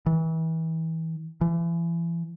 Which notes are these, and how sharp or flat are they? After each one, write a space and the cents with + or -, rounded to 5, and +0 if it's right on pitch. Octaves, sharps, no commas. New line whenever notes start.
E3 -30
E3 +35